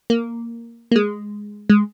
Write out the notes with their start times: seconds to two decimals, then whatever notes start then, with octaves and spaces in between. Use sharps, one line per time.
0.10 A#3
0.91 A#3
0.96 G#3
1.70 G#3